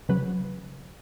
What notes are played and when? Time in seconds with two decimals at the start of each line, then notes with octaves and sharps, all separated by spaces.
0.09 C#3 F#3 B4